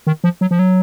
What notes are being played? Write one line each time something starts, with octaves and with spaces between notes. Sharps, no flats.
D#3
F3
F#3
F3
F#3